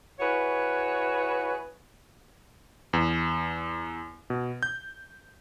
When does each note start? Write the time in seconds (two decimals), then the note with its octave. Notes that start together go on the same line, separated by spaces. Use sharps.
0.20 E4 F#4 G#4 B4 C#5
2.93 E2
4.30 B2
4.63 G6